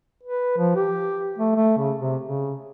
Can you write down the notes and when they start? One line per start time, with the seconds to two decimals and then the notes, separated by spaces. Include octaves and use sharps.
0.23 B4
0.58 F3
0.75 G4
1.38 A3
1.55 A3
1.77 C#3
1.98 C3
2.22 C#3